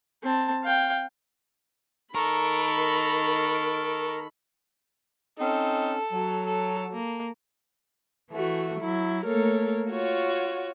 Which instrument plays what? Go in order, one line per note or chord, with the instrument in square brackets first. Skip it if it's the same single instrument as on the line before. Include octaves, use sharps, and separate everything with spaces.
[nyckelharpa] C4 A5
F5 G5
[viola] D#3 B5 [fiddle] A4 C#6 [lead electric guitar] A#4
[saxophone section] C4 C#4 D#4 [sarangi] A4
[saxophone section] F#3
[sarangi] A4
A#3
[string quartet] E3 A3 F#4
F#3 E4
A3 A#3 A4 A#4 C#5
F4 F#4 C#5